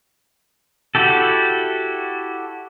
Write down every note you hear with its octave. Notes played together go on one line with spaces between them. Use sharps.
E4 F#4 G4 A4